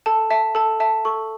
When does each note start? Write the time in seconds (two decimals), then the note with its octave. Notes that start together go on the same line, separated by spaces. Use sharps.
0.06 A4 A5
0.30 E5 A5
0.55 A4 A5
0.80 E5 A5
1.05 A4 C#6